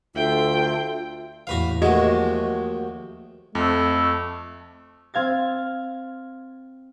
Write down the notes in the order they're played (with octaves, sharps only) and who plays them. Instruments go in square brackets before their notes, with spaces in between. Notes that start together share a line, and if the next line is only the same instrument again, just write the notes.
[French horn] D2 [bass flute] F4 [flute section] A4 E5 F5 [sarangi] G5
[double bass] E2 A2 [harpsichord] F#4 B4 F5
[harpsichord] D#2 A3 [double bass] F3 [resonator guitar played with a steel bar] G#3 [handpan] F#4
[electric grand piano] F2 [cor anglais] A3
[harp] C4 F5 G#6 A6